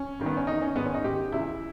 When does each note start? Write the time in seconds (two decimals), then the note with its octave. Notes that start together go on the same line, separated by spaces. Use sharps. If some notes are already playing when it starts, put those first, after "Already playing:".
Already playing: C#4
0.19 G2 D#3
0.26 B3
0.37 C#4
0.47 E2 D#3 D#4
0.62 C#4
0.75 G#2 D#3 B3
0.85 C#4
0.94 D#4
1.04 G#2 D#3 G4
1.32 C#2 C#3 E3 E4